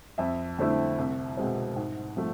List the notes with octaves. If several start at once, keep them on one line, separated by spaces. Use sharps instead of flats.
F2 E5
D3 A3 C4 E4
C2
B2 G#3 C4
G#2
F3 A3